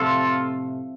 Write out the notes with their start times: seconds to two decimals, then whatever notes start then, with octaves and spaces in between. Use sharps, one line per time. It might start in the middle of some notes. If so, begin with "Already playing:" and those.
Already playing: A2 C3 F3 A3 F4 A4